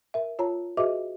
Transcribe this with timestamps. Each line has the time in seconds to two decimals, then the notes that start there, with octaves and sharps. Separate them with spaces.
0.14 A#4 E5
0.39 F4 C#5 A5 A#5
0.77 F#4 G#4 B4 D#5 E5 D6